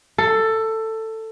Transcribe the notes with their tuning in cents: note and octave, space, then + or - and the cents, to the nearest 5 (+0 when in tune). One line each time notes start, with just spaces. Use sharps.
A4 +15